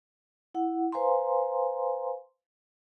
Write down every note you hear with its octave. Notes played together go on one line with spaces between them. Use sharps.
E4 F#5
B4 C5 F5 G#5 A#5 C6